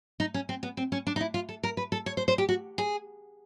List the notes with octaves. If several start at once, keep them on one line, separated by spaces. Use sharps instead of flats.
D#4
C#4
C4
B3
C4
C#4
D4
D#4
E4
F4
A4
A#4
B4
A4
C#5
C5
C5
G4
F#4
G#4